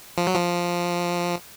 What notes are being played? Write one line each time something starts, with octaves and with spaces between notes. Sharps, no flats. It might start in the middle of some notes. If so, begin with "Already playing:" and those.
F3
F#3
F3